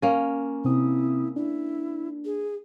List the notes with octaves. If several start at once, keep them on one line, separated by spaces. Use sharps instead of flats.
A#3 C#4
C3 C4 E4 D#6
D4 E4
G#4